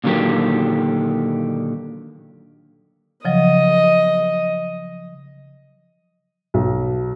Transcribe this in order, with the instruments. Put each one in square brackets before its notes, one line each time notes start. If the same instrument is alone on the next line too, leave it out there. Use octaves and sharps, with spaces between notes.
[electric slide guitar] A#2 D3 D#3 F#3 G4
[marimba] C#3 F3 F#3 [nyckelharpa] D#5
[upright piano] B1